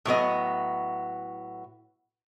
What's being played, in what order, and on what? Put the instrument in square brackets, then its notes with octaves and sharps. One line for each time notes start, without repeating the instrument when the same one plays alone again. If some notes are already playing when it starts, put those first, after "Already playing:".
[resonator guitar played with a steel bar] A2 F#3 B3 D#5